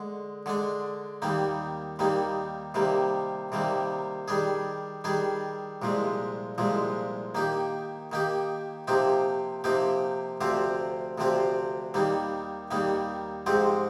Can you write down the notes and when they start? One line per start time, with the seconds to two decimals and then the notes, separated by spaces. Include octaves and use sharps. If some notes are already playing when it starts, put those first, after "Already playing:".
Already playing: D3 G#3
0.46 D3 G#3 D4
1.22 D#2 D#3 G3 A#3 D#4
1.99 D#2 D#3 G3 A#3 D#4
2.74 C3 D#3 G3 A#3
3.52 C3 D#3 G3 A#3
4.28 D#3 G3 D4 G#4
5.04 D#3 G3 D4 G#4
5.82 C2 A#2 F3 G#3
6.58 C2 A#2 F3 G#3
7.35 D#3 A#3 D#4 G4
8.12 D#3 A#3 D#4 G4
8.87 C3 F3 A#3 D#4 G4
9.64 C3 F3 A#3 D#4 G4
10.41 D2 C3 F3 C4 G4
11.18 D2 C3 F3 C4 G4
11.94 D#2 D#3 G3 A#3 D#4
12.71 D#2 D#3 G3 A#3 D#4
13.46 G#2 F3 G#3 C4 G4